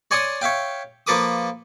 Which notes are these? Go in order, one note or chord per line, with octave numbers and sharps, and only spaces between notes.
C#5 D5 G#5 C6 C#6 D#6
C#5 E5 F5 G5
F3 A#3 A4 B4 D6 D#6